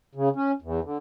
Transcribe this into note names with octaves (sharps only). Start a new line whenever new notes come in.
C#3
C#4
E2
D3